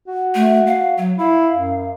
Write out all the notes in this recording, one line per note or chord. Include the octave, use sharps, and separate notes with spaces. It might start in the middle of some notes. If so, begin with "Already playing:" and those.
F#4
A3
F5
F#3
E4 F5
F#2